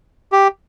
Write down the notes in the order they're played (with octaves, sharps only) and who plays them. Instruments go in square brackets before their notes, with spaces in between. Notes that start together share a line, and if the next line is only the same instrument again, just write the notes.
[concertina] G4